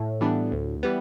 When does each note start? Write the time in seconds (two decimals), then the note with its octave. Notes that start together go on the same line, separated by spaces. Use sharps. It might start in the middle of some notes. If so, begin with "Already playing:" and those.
Already playing: A2
0.21 E3 G3 B3 D4
0.52 D2
0.83 E3 G3 B3